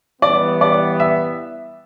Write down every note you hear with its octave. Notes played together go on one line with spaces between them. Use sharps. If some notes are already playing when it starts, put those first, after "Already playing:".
E3 G3 B3 D5
D5
E5